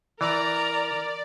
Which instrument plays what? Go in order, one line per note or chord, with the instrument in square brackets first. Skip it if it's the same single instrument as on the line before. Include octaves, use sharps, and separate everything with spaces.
[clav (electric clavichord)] E3 [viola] A#4 A#5 [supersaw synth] D5